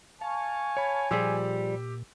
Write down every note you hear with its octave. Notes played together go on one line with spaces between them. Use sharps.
F5 G#5 A5 C#6
C#5 B5
A#2 F3 G3 G4 G#4 E6